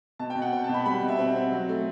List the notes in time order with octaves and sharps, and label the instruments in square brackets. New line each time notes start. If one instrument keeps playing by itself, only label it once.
[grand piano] B2 A5
G5
B2
F#5
C4 G5
A5
B2 B5
G3 B5
B2
E5
C4
C4
F#3
A3